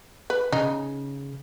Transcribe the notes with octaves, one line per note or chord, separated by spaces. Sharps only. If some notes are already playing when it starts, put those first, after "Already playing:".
B4
C#3 D#4